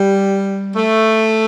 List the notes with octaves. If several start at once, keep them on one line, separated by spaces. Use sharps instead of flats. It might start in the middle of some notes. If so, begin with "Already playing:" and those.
Already playing: G3
A3